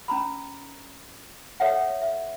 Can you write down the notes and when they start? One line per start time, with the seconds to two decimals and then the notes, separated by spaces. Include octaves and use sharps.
0.08 C#4 A#5 B5
1.60 A4 C#5 E5 F#5
2.02 E5